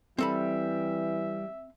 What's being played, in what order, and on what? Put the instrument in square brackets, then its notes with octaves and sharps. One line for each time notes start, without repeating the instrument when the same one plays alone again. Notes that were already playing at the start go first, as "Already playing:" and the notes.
[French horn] E3 [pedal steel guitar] G3 [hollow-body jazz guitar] C4 A4 B5 [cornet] E5